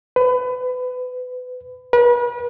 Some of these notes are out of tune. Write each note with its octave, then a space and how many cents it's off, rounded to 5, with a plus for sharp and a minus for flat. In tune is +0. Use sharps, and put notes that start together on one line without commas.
B4 +25
B4 -40